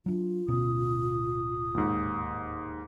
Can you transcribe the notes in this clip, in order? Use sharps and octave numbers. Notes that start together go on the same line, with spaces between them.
F#3 D4 F4
D1 B2 C#4 D#6
D#2 G#2